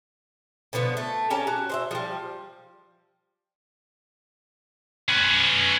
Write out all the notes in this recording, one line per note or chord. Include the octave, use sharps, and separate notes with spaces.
B2 D3 F3 B3
A3
C#4 G4 A5 A#5
F#4
C5 D5 E5
F3 G3
C#4 B4